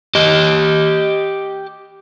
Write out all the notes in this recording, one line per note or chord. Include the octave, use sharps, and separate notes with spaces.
G4 D#5